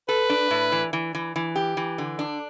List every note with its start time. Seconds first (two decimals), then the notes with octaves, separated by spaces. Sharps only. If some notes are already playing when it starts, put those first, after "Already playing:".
0.08 A4 B4
0.30 D4
0.51 A2
0.72 E3
0.93 E3
1.15 E3
1.36 E3
1.56 G4
1.77 E3
1.98 D3
2.19 D4